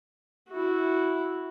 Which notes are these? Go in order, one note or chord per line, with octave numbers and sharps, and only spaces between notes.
E4 F#4